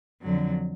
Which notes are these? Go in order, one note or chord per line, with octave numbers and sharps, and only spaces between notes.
F2 D3 F#3